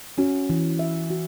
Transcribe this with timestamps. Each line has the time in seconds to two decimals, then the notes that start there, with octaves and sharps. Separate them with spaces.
0.18 C#4 F#4
0.50 E3
0.79 E5
1.10 F#4